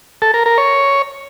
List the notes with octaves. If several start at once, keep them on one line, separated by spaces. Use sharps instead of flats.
A4
A#4
A#4
C#5